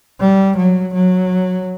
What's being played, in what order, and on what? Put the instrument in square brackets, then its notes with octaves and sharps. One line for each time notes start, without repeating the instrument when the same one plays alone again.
[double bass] G3
F#3
F#3